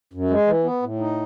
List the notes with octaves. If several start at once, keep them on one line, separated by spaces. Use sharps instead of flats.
F#2
G#3
E3
B3
A2
D#4